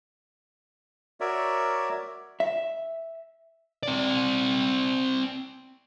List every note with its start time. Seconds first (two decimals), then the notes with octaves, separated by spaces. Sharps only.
1.20 F#4 A#4 C#5 D5 E5
2.40 E5
3.83 C4 D5